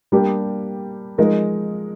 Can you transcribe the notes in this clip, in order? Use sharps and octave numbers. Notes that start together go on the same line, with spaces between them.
G3 A#3 D4 G4
F3 G#3 D#4 A#4